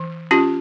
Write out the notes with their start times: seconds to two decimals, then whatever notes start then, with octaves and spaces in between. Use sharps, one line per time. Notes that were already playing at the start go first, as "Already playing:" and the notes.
Already playing: E3
0.31 C#4 F4 G4